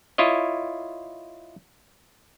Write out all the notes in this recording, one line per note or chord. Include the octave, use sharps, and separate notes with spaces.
E4 F4 C#5 D#5